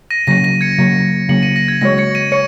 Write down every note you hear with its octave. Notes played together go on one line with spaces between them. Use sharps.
A#6 D#7
C#3 F#3 A#3 A#6 D#7
A#6 D#7
G#6 C#7
C#3 F#3 A#3
C#3 F#3 A#3 C#7 F#7
A#6 D#7
A#6
G#6
C#3 G#3 F#4 C#5 A#6
G#6 C#7
A#6 D#7
C#5 C#7